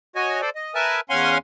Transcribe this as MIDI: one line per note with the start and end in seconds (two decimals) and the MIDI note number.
0.16 0.41 66
0.16 0.41 73
0.16 0.41 75
0.16 0.41 80
0.41 0.50 69
0.41 0.50 72
0.41 0.50 74
0.55 0.74 75
0.75 1.01 70
0.75 1.01 71
0.75 1.01 76
0.75 1.01 80
0.75 1.01 81
1.10 1.38 40
1.10 1.38 61
1.10 1.38 77
1.10 1.38 78
1.10 1.38 80
1.10 1.38 84